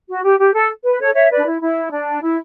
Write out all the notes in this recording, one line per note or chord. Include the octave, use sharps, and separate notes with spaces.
F#4
G4
G4
A4
B4
A4 C#5
C#5 E5
B4 D5
D4
E4
E4
D4
E4